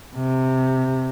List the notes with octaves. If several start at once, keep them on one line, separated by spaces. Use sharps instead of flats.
C3